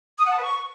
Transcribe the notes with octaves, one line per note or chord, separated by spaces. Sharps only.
D#6
F#5
A5
B4
C#6